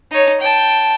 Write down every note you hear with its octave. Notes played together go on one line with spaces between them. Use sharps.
D#4 C#5
G5 A5